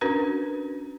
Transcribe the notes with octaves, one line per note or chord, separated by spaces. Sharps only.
C#4 D4 F#4 A#4 B4